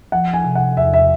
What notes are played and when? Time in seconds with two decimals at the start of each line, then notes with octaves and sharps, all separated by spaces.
0.12 F3 F#5
0.33 G#5
0.45 C3
0.55 F#5
0.77 E2 E5
0.94 E5